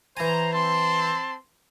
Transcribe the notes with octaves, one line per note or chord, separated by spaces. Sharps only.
E3 C5 G#5 A#5
C4 A5 C6